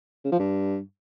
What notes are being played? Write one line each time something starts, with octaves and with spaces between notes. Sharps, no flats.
C#3
F3
G2